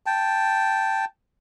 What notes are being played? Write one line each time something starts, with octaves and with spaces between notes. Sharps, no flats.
G5 A5